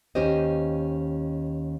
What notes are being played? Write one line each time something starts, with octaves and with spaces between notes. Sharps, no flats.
D#2 C#4 G4 C5 D#5